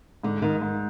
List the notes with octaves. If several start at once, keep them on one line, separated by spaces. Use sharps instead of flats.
G#2 D3
G#2 D#3
G#2